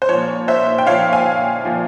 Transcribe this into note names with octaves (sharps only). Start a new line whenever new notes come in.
C5
A#2 F3 C#5
C5 E5
G5
A#2 F3 C#5 F5
F5 G#5
A#2 F3